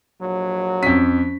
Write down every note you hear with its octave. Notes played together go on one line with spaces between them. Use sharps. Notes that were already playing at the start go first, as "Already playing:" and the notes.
A#1 F#3
F2 C#4 B6